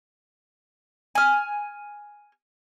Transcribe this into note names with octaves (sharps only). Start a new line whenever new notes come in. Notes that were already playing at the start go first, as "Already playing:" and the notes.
G#5 F6